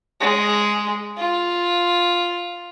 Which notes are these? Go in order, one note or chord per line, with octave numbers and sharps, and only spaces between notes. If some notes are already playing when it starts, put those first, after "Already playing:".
G#3
F4